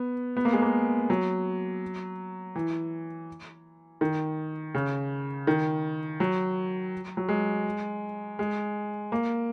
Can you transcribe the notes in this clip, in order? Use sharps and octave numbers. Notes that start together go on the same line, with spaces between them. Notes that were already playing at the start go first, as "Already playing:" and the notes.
Already playing: B3
B3
A#3
G#3
A#3
F#3
E3
D#3
C#3
D#3
F#3
F#3
G#3
G#3
A#3